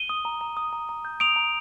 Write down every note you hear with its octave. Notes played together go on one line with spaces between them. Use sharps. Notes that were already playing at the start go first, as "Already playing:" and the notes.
Already playing: D#7 G7
D#6
A#5
A#5
D#6
A#5
A#5
G6
D#6 D7 F7
A#5